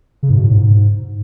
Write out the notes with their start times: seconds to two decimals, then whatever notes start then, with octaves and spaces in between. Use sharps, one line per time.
0.23 C#3
0.30 G#2
0.37 B2
0.44 A2
0.51 G#2